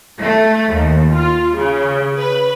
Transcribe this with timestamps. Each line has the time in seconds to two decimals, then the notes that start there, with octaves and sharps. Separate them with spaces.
0.20 A3
0.73 D#2
1.13 F4
1.56 C#3
2.17 B4